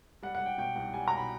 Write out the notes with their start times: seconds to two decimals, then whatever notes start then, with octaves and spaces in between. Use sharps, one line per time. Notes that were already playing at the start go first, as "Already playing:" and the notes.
0.23 G3 F#5
0.35 F#5
0.40 G3
0.46 G5
0.58 B2 G5
0.76 C2
0.94 G3 G#5
1.08 A#5
1.11 B2
1.17 B5